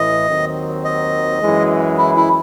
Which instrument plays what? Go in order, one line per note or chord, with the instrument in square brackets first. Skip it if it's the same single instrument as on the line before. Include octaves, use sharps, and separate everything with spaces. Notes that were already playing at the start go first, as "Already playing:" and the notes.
Already playing: [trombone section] A1 A2 E3 [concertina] D#5
[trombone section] D#2 D#3 F#3 C4
[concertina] D#5
[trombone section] F#2 E3 G#3
[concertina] E4
E4